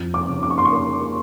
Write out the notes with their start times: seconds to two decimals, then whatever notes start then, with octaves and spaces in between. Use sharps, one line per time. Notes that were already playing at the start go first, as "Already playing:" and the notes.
Already playing: F2
0.14 D6
0.28 C#3
0.43 D6
0.50 C#6
0.58 C6
0.65 C#6
0.72 A#3